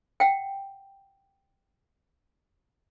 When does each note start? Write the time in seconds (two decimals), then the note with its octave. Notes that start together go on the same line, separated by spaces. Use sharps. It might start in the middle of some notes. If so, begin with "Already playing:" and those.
0.20 F#5 G5